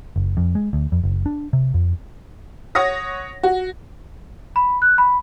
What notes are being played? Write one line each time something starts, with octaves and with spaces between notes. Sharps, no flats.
F#1
F2
G#3
D2
F2
F#1
D4
C3
F2
C#5 F#5 D#6 A#6
F#4
B5
F#6
B5